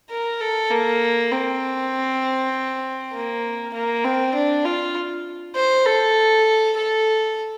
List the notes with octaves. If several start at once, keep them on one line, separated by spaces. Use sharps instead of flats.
A#4
A4
A#3
C4
A#3
A#3
C4
D4
F4
C5
A4
A4